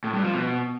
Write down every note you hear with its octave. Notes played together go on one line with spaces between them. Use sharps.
A2
G2
F3
B2